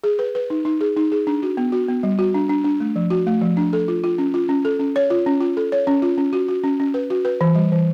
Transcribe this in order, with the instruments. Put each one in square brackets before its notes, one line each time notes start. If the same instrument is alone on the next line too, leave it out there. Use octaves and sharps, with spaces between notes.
[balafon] G#4
B4
B4
D#4
D#4
G#4
D#4
G#4
D4
F#4
B3
F#4
B3
G3
F#4
D4
D4
D4
A3
F3
F#4
A3
F3
D4
A4
F4
F4
C#4
F4
C#4
A4
C#4
C#5
F4
C#4
F4
A4
C#5
C#4
F4
C#4
F#4
F#4
C#4
C#4
B4
F#4
B4
E3
G3
E3